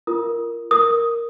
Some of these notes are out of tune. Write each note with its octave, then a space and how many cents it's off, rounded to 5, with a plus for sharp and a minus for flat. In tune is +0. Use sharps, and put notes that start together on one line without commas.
F4 -25 A#4 +0 D#6 +0
A#4 +0 D#6 +0